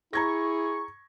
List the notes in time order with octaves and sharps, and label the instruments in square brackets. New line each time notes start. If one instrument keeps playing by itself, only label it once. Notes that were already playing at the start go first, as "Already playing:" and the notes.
[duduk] E4 [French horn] G#4 [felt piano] A#5 G#6 A#6 [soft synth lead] C#6